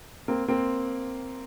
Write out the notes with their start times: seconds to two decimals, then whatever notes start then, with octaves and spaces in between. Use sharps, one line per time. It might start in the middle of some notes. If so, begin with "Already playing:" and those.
0.28 A#3 C4
0.48 A#3 C4